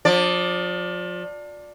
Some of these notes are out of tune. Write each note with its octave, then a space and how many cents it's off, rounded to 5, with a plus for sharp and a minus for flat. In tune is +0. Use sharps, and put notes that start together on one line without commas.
F3 +35 D5 +0